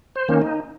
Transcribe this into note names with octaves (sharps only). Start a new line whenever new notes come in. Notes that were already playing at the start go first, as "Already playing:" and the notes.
C5
D#3 A#3 C#4
D#4